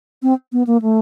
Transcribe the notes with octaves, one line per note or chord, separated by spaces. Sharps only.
C4
B3
A#3
A3